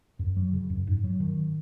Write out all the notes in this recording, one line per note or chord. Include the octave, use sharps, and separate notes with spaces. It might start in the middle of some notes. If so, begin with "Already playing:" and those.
F#2
F#3
C#3
F#2
G#2
F#3
D#3